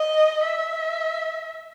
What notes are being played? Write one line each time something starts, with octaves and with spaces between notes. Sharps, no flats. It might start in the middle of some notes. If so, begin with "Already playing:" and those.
Already playing: D#5
E5